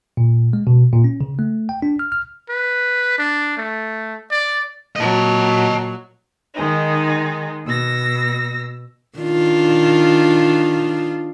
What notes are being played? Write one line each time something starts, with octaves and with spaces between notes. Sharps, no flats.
A#2
G#3
B2
A#2
C#4
C#3
A3
G5
D4
F6
F6
B4
D4
A3
D5
A#2 F#3 D#5 A5
D#3 G#3 D#4
B2 E6 A#6
D#3 D4 F4